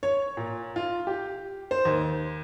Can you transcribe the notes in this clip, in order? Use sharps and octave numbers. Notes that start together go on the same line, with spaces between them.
C#5
A#2
F4
G4
C5
D#2